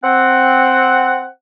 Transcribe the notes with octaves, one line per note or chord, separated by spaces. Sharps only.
C4 F#5